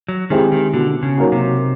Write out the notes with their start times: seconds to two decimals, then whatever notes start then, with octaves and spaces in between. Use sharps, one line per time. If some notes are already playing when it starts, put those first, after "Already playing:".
0.09 F#3
0.30 D#3 G#3 C4 E4 G4
0.52 D#3
0.74 B2 D3
1.03 C#3
1.17 F#3 A#3 D#4 F#4
1.32 C3